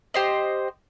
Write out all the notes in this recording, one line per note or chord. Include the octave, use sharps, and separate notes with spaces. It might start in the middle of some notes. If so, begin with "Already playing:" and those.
G4 C5 D#5